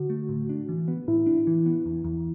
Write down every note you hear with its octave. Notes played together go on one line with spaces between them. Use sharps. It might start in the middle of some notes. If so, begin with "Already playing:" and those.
Already playing: D3 F#4
A3
A2
D4
E3
B3
A2 E4
D4
E3
B3
E2
E2